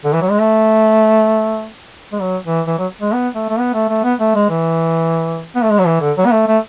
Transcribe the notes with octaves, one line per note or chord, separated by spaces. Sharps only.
D3
E3
F#3
G#3
A3
G#3
F#3
E3
E3
F#3
G#3
B3
A3
A3
B3
A3
A3
B3
A3
G#3
E3
B3
A3
G#3
F#3
E3
D3
F#3
B3
A3
A3